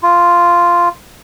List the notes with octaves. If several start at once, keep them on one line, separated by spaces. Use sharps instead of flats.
F4